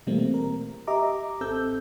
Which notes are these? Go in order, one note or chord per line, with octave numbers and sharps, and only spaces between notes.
B2 E3 G3 A3 A#3 C4
A#4
G4 D#5 E5 A#5 D6
G#1 C4 A4 E6 G6